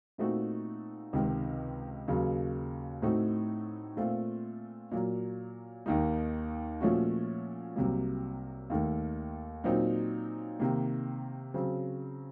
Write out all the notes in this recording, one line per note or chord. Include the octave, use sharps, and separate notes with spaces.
A#2 A3 C4 D#4 F#4
C#2 C3 D#3
D#2 C#3 F#3
A2 A3 C4 D#4 F#4
A#2 A3 C4 F4
A#2 F#3 A#3
D#2 D#3 A#3 D#4
A#2 F3 A3 C#4 F#4
C2 C3 F#3 A#3
D#2 D#3 A3
A#2 F#3 C4 D#4
C3 D#3 A#3
C#3 F#3 C4